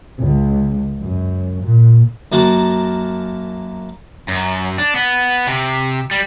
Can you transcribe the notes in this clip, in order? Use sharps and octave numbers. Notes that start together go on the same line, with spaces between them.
C#2
F#2
A#2
F#2 A#3 F#4 A#4 A5
F#2
D4
B3
C3
G3